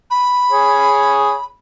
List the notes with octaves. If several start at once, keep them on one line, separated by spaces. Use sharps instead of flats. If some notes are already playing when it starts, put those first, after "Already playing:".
B5
G#4 C#5